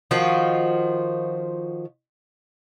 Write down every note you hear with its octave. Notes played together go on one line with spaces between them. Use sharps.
D#3 F3 F4 F#4